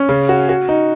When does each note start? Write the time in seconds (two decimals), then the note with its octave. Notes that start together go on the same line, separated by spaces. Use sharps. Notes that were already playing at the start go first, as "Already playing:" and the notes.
Already playing: C#4
0.09 C#3
0.29 F#4
0.49 F#4
0.69 D#4